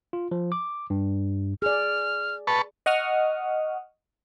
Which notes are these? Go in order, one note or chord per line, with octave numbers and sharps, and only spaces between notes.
F4
F3
D6
G2
G#4 D5 F6
B4 A5 C#6
D#5 F#5 C#6 D#6 F6